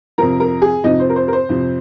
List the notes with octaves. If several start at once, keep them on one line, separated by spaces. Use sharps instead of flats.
F2 C3 F3 A#4 A#5
A#4 A#5
G#4 G#5
F2 C3 F3 D#4 D#5
C5
A#4
C5
A#4
C5
F2 C3 F3